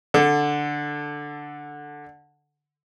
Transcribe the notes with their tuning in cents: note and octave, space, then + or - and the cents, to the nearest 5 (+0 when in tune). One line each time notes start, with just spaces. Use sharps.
D3 +0 A4 +0